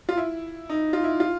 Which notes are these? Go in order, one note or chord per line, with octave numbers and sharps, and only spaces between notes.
F4
E4
D#4
F4
E4
F4